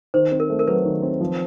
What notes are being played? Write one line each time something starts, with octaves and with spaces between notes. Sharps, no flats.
D#3 C5
C4
A#4
A3
A#4
F#3 B4
D#3
C4
F3